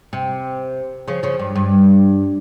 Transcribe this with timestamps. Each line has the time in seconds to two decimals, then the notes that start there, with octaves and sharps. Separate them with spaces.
0.13 C3
1.08 C#3 F3
1.23 C#3 F3
1.39 G2
1.56 G2